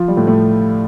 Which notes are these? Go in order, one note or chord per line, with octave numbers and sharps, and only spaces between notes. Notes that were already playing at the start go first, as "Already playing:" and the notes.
Already playing: F3 F4
G3
A2 A3
A2 A3